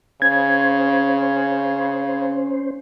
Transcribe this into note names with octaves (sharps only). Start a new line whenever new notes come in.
C#3 C#4 C5 G#6